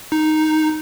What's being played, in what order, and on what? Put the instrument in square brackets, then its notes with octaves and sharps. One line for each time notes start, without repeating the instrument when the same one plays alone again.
[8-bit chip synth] D#4